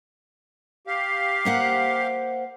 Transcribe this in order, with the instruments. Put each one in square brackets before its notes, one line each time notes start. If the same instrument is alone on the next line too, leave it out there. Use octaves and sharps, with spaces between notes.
[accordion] G4 F5
[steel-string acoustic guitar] A#3 C5 F#5